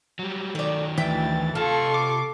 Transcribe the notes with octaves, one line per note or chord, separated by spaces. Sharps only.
F#3 G3
D#3 F#3 A3 D5
D2 E3 E5 G5 A6
C3 F4 A4 A5 C6 C#6
D6